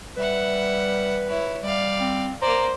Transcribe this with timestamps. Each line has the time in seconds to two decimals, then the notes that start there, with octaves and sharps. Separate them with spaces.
0.17 G3 B4 E5 F#5
1.27 E4 C#5
1.63 G3 D5 F5
2.00 C4
2.42 A#3 C5 D5 A#5